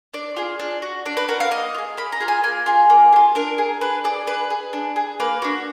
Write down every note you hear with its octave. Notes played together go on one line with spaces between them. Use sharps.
D4 D5
F4 G#4
D4
F#4
D4 D5
B4
F#4 A#4
F5
A#3 D#5
F4
G#4
A#3 B5
A#5
F4 G#4
G#5
A#3 G#5
F4 G#4
A#3
G#4
F4
D4 A#4
G#4
D4 B4
G#4 D5
D4 B4
G#4
D4
G#4
A#3 B4
D4 F#4